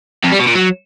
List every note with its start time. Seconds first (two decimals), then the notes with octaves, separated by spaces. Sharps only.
0.24 F2
0.32 G3
0.39 B2
0.47 A#2
0.55 F#3